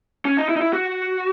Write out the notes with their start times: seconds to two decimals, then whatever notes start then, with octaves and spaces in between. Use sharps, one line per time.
0.25 C#4
0.37 D#4
0.49 E4
0.56 D#4
0.61 E4
0.73 F#4